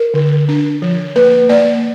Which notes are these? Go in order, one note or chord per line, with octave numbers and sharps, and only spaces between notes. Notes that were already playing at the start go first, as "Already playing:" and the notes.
Already playing: A#4
D3
D4
F3
A#3 B4
A#3 D5